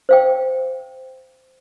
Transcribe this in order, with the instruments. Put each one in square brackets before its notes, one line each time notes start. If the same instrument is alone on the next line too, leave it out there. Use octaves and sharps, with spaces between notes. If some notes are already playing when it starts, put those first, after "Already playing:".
[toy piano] C5 F5 G5